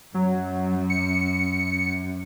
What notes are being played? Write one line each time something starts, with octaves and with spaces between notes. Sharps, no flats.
F#2 F#3
C#7